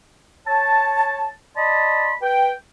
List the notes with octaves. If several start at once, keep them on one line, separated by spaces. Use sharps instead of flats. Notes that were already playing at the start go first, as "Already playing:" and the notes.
C#5 A5
D5 D#5 A5 B5 C6
B4 G5